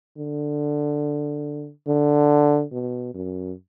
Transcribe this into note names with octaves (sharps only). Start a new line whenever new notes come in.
D3
D3
B2
F#2